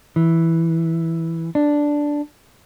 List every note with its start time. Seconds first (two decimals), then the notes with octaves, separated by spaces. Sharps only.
0.16 E3
1.55 D4